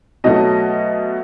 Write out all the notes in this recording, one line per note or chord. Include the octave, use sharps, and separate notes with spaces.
B2 F#3 A3 D#5